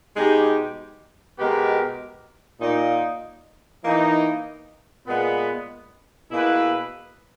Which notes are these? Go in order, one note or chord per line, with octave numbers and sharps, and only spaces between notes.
B2 G#3 D#4 G4
B2 G#3 B3 G4 A#4
A#2 A#3 D#4
E3 A#3 D#4
A#2 G#3 B3
B2 A#3 E4 G#4 B4